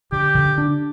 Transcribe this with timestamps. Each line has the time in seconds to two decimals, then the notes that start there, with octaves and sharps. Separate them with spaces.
0.12 D3 G4
0.35 D3
0.58 D4